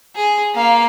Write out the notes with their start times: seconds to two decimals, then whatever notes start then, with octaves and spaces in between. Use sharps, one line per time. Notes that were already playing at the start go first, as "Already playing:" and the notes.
0.16 G#4
0.55 A#3 F5